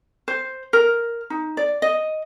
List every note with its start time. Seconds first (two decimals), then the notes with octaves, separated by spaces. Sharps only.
0.28 C5
0.73 A#4
1.30 D#4
1.57 D5
1.82 D#5